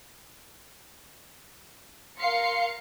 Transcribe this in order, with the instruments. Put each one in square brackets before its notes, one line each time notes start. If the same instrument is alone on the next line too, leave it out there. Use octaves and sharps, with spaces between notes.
[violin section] A#4 F5 C6 C7 C#7